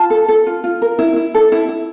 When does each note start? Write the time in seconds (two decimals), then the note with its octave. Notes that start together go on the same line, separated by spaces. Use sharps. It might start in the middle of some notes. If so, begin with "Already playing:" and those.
Already playing: F4 A5
0.10 A4
0.28 A4
0.47 F4
0.64 F4
0.82 A#4
0.99 E4
1.16 E4
1.35 A4
1.52 E4
1.69 E4